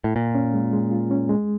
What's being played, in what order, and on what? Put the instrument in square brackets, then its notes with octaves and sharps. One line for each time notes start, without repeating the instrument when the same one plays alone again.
[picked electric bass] A2
[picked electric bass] A#2 [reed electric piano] F4
[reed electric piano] C#4
G#3
G#3
F4
C#4
G#3